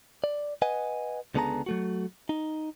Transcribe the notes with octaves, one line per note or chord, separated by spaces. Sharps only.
D5
B4 D#5 F#5 G#5
C#2 D3 B3 G#4 A5 A#5
F#3 A3 F#4
D#4